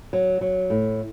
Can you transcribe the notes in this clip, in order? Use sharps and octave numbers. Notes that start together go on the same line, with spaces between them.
F#3
F#3
A2